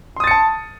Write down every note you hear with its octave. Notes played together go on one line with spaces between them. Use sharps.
A5 C6 D#6 A6 C#7